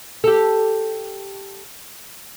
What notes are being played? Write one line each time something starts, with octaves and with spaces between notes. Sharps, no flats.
G4 A4